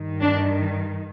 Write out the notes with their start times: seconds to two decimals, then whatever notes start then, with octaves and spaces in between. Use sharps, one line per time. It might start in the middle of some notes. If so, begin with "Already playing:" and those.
Already playing: G2 D#3
0.21 D4